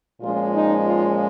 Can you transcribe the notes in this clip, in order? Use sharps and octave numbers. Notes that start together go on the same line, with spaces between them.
A#2 F3 G#3 C#4 F4
D#4
F4